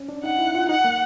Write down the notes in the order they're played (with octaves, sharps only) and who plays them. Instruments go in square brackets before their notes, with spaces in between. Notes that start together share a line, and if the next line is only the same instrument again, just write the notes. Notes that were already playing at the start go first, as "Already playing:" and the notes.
Already playing: [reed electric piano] C#4
D4
[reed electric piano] D#4 [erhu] F#5
[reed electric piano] E4
F4
[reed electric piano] D#4 [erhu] F#5
[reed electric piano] A#3